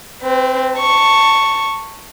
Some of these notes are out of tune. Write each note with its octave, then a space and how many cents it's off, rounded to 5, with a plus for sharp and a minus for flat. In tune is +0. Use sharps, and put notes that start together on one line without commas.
C4 +0 B4 +40
A5 +25 C#6 +0